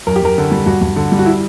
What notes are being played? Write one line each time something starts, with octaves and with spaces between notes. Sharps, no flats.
F#2 A#4
G4
F#2 A#4
D3
G3
G2 F#4
G2
D3
G3
F#4
E4